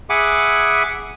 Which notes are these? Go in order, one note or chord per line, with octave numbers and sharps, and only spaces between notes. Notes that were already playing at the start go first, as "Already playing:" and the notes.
G#4 E5 F#5 G#5 B5 D6